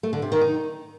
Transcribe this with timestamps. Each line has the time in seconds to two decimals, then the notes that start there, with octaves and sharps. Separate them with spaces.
0.03 A3
0.13 D3
0.22 C3
0.32 D#3
0.41 D#4